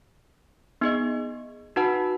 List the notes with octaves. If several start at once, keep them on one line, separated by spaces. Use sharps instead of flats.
B3 D#4 G#4 D#5
D#4 F#4 B4 F#5 A5